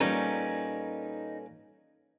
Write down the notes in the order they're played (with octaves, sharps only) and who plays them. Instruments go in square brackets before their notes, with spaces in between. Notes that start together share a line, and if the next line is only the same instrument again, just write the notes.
[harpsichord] A#2 G3 G#5 [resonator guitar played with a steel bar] C#4 [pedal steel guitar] D#4 [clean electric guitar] A4 B4 A#5